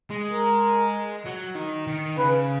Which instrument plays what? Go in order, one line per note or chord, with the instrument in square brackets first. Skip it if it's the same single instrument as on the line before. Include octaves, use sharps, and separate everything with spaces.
[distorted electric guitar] G#3
[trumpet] A#4
[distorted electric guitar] F#3
D#3
D#3
[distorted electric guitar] C#3 [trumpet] B4